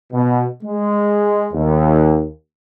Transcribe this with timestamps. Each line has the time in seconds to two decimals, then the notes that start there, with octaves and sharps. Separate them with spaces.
0.13 B2
0.63 G#3
1.54 D#2